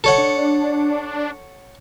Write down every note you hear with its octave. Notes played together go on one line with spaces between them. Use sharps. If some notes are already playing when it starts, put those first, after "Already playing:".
A4 C#5 F#5
D4